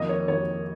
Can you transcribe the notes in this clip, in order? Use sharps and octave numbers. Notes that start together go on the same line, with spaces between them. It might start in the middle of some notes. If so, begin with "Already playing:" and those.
Already playing: F2 D#3 A#3 D#5
C#5
F2 D#3 A#3 C#5